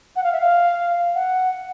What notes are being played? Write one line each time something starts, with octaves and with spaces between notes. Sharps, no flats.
F#5
F5
E5
F5
F#5